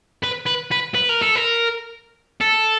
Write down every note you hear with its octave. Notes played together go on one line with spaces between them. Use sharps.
B4
B4
B4
B4
A#4
A4
A#4
A4